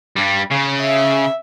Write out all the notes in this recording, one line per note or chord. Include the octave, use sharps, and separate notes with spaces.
G2 G3
C#3 C#4
E5